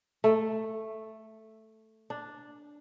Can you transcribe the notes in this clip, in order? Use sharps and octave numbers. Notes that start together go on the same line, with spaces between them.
A3
D4